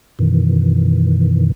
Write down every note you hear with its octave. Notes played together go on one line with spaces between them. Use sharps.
F#2 B2 D#3 E3